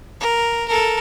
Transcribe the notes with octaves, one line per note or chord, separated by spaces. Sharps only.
A#4
A4 A#4